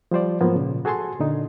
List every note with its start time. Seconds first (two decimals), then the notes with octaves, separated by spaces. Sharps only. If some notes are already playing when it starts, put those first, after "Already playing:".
0.11 F3 G3 C5 D5
0.41 G#2 F3 F#3 A#3 B3
0.56 A#2 C#3
0.85 F#4 G#4 A4 G#5 A5 C6
1.20 A#2 D3 D#4